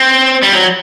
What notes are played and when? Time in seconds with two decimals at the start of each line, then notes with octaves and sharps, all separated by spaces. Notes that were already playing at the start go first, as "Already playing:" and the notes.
Already playing: C4
0.43 G3
0.53 F#3